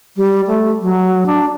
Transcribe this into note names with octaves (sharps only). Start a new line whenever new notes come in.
G3
A3
F#3
D4